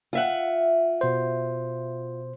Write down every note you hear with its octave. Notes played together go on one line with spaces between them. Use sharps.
F4 E5 F#5
B2 C5